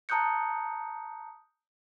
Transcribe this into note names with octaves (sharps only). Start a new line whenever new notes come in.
A5 A#5 D#6 F#6 G6 C#7